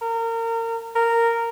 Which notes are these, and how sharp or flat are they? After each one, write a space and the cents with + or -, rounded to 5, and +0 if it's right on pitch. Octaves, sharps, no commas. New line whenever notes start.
A#4 -30
A#4 -10